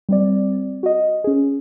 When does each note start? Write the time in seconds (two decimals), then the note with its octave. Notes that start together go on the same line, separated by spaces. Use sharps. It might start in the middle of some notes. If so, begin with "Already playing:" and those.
0.09 G3 C4 D5
0.83 F#4 D#5
1.24 C#4 G#4